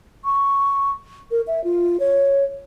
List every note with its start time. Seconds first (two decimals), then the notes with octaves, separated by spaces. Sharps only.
0.25 C#6
1.31 A#4
1.47 E5
1.64 F4
2.00 C#5